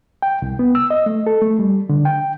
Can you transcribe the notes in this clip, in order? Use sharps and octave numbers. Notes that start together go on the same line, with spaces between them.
G5
C2
B3
E6
D#5
A3
A4
A3
G3
D3
G5